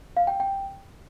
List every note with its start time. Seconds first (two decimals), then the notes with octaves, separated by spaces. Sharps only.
0.17 F5
0.27 G5
0.40 G5